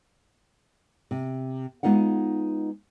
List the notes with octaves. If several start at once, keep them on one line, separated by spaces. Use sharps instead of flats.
C3
G#3 B3 D#4 F4 F#5